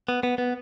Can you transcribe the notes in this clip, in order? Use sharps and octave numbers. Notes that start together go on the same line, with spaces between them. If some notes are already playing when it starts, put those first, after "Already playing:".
B3
B3
B3